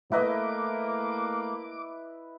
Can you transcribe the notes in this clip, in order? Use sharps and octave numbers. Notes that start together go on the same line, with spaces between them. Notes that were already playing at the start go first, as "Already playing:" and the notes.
A3 A#3 E4 B4 D#5 D6